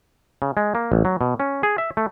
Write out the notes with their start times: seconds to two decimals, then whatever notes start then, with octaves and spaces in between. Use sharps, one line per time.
0.42 C#3
0.57 G#3
0.75 A#3
0.92 A1
1.05 F#3
1.21 B2
1.40 C#4
1.63 G#4
1.78 E5
1.97 A3